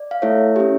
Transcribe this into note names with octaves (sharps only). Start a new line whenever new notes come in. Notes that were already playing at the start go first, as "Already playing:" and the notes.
Already playing: D5
F5
A3 E4 A4 C#5 E5
C#4 E4 G4